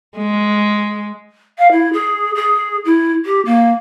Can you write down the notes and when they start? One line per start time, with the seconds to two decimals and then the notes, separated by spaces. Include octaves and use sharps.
0.17 G#3
1.58 F5
1.71 E4
1.93 G#4
2.35 G#4
2.85 E4
3.25 G4
3.45 A#3